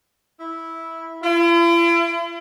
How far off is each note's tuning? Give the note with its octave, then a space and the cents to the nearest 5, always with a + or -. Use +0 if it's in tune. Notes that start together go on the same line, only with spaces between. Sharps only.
E4 -10
E4 +45